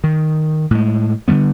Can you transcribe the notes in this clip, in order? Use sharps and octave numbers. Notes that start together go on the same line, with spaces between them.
D#3
A2 G#3
D3 F#3 G3 B3